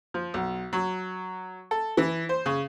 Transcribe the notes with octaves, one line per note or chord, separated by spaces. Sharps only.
F3
B1
F#3
A4
E3
C5
C#3